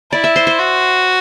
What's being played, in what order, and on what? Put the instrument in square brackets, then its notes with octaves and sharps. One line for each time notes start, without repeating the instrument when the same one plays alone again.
[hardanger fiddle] E4 [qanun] D5
[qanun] E5
C5
C5
[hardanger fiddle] F#4